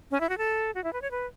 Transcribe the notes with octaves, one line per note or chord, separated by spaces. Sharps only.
C#4
E4
F#4
A4
F#4
E4
B4
C#5
B4